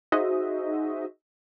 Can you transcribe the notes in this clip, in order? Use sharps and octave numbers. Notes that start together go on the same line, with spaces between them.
D#4 F#4 G#4 C5 D#5 E5